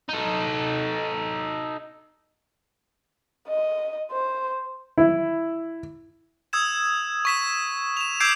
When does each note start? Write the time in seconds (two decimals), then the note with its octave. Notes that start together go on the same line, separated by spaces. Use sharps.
0.09 D#4 A4
3.48 D#5
4.12 C5
4.98 E4
6.53 D#6 E6 G#6 E7
7.25 C#6 B6 E7
7.97 E7 F7
8.20 D6 E6 G6 G#6 C7 D7